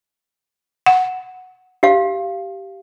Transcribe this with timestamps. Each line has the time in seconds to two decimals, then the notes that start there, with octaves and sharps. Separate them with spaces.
0.86 F#5
1.83 G4 F5